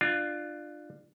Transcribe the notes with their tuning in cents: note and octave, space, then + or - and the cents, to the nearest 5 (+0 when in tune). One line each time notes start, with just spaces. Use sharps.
D4 +25 F4 +0